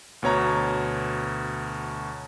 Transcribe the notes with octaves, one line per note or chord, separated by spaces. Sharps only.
D2 B2 C#5 A#5